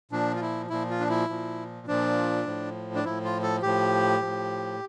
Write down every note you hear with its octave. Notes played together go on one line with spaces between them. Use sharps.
A#2 F3 D4
F4
E4
A#2 F3 E4
F4
D4
E4
A#2 F3
A#2 F3 D4
A2 F3
D4
A2 F3 E4
F4
A4
A2 F3 G4
A2 F3